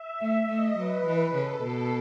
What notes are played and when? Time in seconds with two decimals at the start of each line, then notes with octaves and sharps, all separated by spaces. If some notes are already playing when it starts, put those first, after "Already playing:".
Already playing: E5
0.21 A3
0.49 A3 D#5
0.78 F#3 B4
1.06 E3
1.34 C#3 A4
1.63 B2 A4